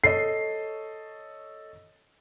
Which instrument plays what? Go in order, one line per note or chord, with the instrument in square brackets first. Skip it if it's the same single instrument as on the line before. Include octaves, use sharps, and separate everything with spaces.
[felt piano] A4 C#5 D#5 [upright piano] C7